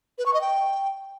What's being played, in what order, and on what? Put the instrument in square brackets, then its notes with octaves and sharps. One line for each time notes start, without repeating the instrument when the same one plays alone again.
[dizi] B4
C#6
D#5
G5